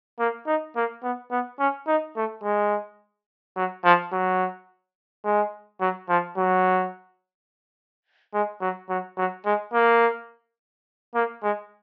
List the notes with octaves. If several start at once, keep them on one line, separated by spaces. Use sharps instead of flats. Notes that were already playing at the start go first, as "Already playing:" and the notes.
A#3
D#4
A#3
B3
B3
C#4
D#4
A3
G#3
F#3
F3
F#3
G#3
F#3
F3
F#3
G#3
F#3
F#3
F#3
G#3
A#3
A#3
G#3